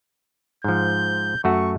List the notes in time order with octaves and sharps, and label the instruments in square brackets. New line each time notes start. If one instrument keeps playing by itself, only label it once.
[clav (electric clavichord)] G#2 F3 [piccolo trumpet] G6
[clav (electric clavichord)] F#2 A3 F#4 [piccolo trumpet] C#6